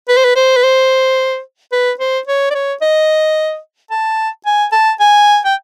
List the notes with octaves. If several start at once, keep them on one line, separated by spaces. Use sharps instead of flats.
B4
C5
B4
C5
B4
C5
B4
C5
C#5
D5
C#5
D#5
A5
G#5
A5
G#5
G5